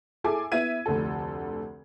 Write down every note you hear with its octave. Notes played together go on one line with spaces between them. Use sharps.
E4 G#4 A4 G#5 D6
B3 E4 E5 G#6 D#7
F1 D2 A4